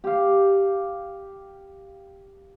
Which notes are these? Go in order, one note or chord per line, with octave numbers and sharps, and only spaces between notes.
G4 F5